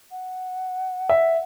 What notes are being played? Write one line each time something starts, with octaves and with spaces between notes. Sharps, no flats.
F#5
E5